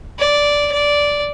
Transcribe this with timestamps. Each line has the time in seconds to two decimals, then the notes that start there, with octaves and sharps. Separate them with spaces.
0.19 D5
0.72 D5